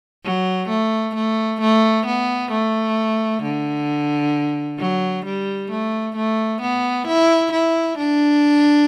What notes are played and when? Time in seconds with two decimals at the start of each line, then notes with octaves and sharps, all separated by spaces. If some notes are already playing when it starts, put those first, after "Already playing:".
0.24 F#3
0.69 A3
1.15 A3
1.61 A3
2.06 B3
2.52 A3
3.43 D3
4.79 F#3
5.25 G3
5.70 A3
6.16 A3
6.61 B3
7.07 E4
7.52 E4
7.98 D4